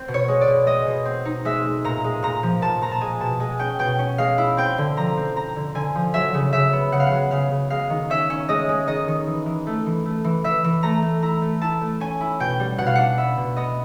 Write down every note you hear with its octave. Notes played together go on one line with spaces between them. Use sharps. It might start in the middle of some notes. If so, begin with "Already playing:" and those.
Already playing: C4
B2
C#5
G#3
D5
B2
G#3 D#5
B2
C4
D#4
G#3 E5
G#3
A#2 A#5
G#3
A#2 A#5
F3
A#2 A5
A#2 A#5
A5
G#3 G#5
B2 A5
G#3 G#5
C#4 G5
B2 G5
C#4
G#3 F5
E4
C4 G5
D3
F3 A#5
C4
C4 A#5
D3
D3 G#5
F3
F#3 E5
C#3
C#3 E5
B3
C#3 F#5
F5
F#5
F#3
C#3 F5
C#3
G#3 F5
D#3
C#4 E5
C#4
G#3 D#5
G#3
D#3 D#5
D#3
E3
E3
A3
E3
A3
E3
E3 E5
E3
A3 A#5
A3
E4 A#5
A3
E4 A5
A3
C#4 G#5
E4
B2 G5
G3
B2 F#5
F5
D4 F#5
B3 E5
B2
B3 D#5